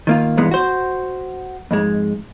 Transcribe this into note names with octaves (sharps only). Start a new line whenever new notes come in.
D#3 A#3 F4
B1 G2 E3 G#3 B3
F#4 C5
F2 G#2 G#3